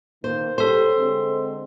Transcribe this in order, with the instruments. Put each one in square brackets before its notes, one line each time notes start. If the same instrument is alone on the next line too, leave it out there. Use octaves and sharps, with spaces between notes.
[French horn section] D#3 A#3 [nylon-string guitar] C5
[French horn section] G3 C#5 [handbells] A4 C6 [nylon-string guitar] C5
[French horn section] D3 G#3 C4